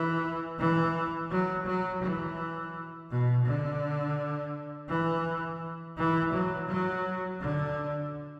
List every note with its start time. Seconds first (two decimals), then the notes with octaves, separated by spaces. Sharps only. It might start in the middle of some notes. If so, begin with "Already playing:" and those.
Already playing: E3
0.59 E3
1.31 F#3
1.67 F#3
2.02 E3
3.10 B2
3.46 D3
4.89 E3
5.97 E3
6.33 F#3
6.69 F#3
7.41 D3